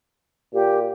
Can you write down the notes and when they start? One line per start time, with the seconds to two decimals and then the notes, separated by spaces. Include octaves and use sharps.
0.54 A#2 G4